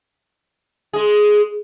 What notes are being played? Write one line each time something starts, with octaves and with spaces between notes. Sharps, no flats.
G#3 G#4